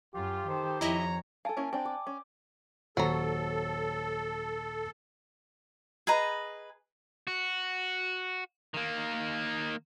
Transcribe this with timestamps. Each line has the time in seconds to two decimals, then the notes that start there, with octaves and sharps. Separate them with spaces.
0.15 F#2 F4 G4
0.47 D#3 A4 C5
0.81 F2 E4 C#5 D#5 E5 A#5
1.45 A4 F5 G#5 A5
1.57 A#3 C#4 E4
1.73 C4 D4 G5
1.85 D5
2.07 C#4
2.97 D#1 F#3 A4 A#5 C#6
6.07 G#4 B4 D#5 A#5
7.27 F#4
8.74 D#3 A#3